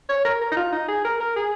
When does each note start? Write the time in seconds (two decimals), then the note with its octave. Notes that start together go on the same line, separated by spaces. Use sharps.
0.09 C#5
0.25 A#4
0.41 A#4
0.52 D#4
0.57 F4
0.72 D#4
0.88 G#4
1.05 A#4
1.20 A#4
1.36 G#4